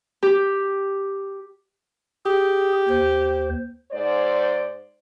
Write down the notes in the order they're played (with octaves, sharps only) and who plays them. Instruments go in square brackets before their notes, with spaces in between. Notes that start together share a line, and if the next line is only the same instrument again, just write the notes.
[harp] G4
[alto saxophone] G4 [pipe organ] G#4
[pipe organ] D#2 C5
[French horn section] G#2 C5 D5